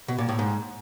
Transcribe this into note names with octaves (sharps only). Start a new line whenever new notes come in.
B2
A#2
A2
G#2